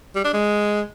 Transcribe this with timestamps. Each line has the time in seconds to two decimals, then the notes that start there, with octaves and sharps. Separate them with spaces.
0.16 G3
0.24 D4
0.33 G#3